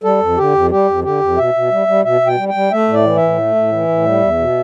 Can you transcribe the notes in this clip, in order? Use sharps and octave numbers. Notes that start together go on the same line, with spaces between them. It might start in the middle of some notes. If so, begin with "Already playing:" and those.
G3 A4
F2
D3 G4
F2
G3 G4
F2
D3 G4
F2
B2 E5
B2
G3
G3
B2 E5
B2
G5
G3
G5
G3
A3 E5
A2
D5
E3
E5
A2
A3
A2
E3
A2
G3
E2
B2